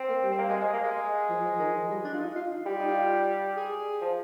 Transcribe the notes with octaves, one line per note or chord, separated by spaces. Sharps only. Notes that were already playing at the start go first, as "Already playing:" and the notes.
Already playing: C4
A#3
G3
C4
A#3
G#3
G#3
A#3
G#3
F3
F3
D#3
F3
G3
D4
F4
D#4
F4
D#4
G3 G4
F4
D#4
F4
G#4
F3